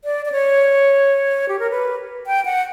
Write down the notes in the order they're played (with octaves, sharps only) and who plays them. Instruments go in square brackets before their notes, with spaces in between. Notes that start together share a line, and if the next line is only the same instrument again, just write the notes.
[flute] D5
D5
C#5
G4
A#4
B4
G5
F#5